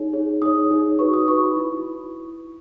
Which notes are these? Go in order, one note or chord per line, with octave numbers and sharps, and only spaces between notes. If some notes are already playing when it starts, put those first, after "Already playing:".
Already playing: D#4 G#4 C#5
D#4 G#4 C#5
D#4 G#4 C#5 D#6
D#4 G#4 C#5
D#4 F#4 B4 C#6
D#6
D#4 F#4 B4 C#6
B5
E4 B4